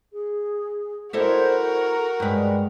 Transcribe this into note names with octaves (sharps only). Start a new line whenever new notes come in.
G#4
E4 F#4 A4 A#4 C5 D#5
A#5
G2 G#3 B4